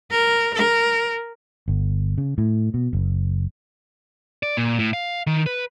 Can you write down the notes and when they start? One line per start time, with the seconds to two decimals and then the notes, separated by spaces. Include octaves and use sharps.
0.11 A#4
0.54 A#4
1.68 G1
2.18 C#3
2.38 A2
2.74 B2
2.93 F#1
4.43 D5
4.57 A#2
4.79 A2
4.93 F5
5.27 D#3
5.46 B4